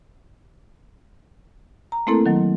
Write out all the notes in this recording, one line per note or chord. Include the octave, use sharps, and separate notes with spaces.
A#5
A3 A#3 C4 E4 A4 A#4
D#3 F#3